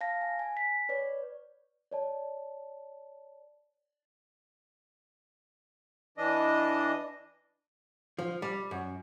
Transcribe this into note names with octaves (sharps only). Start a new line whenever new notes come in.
F5 A5 A#6
G#5
G#5
B6
B4 C#5 D5
C#5 D5 A5
E3 D4 D#5
F3
G3
F#2